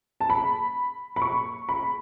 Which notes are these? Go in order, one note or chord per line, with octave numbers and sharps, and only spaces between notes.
A5
B5
B5
C#6
B5